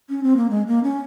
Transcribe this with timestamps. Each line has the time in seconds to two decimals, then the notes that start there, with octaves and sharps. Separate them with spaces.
0.10 C#4
0.23 C4
0.37 A#3
0.50 G#3
0.67 A#3
0.84 C#4